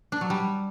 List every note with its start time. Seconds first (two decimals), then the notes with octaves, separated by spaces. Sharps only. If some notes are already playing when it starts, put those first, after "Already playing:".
0.12 D4
0.21 F#3
0.30 G3